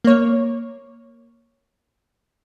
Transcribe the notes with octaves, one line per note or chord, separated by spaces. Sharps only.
A#3 C#5